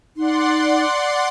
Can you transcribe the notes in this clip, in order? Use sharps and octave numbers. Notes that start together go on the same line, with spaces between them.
D#4 D5 F#5 C6